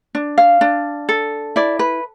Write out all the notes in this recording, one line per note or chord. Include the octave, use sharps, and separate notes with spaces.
D4
F5
D4
A4
E4 D5
B4